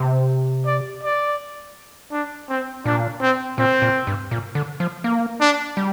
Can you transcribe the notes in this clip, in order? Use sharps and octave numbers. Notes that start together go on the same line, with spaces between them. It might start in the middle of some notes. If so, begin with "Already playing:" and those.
Already playing: C3
D5
D5
D4
C4
A#2 D4
C4
A#2 C4
A#2
G2
A#2
D3
F3
A#3
D4
G3